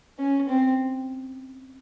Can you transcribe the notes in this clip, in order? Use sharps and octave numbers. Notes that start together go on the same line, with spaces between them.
C#4
C4